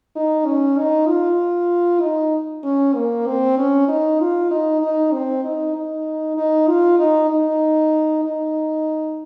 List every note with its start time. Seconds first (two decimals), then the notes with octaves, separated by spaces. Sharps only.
0.16 D#4
0.46 C#4
0.78 D#4
1.09 F4
2.02 D#4
2.64 C#4
2.95 A#3
3.27 C4
3.58 C#4
3.89 D#4
4.20 F4
4.51 D#4
4.82 D#4
5.13 C4
5.44 D#4
5.75 D#4
6.37 D#4
6.68 F4
6.99 D#4
7.31 D#4
8.25 D#4